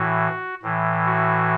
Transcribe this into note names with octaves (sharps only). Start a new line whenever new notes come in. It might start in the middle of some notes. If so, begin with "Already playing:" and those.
Already playing: A2 E3 F#4
A2 E3
F#4